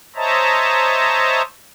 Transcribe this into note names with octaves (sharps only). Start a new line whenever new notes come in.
C5 C#5 D#5 E5 A5 A#5